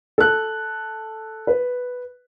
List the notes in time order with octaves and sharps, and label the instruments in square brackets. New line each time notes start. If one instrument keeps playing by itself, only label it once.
[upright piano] A4 F#6
B4